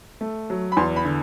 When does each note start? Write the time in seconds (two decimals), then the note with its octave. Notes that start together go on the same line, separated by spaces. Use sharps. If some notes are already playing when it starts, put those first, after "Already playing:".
0.21 A3
0.50 F#3
0.72 B5
0.77 E2 C6
0.96 B5
1.05 D3